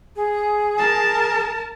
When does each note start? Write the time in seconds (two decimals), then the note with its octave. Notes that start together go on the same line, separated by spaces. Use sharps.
0.16 G#4
0.78 A#4 A5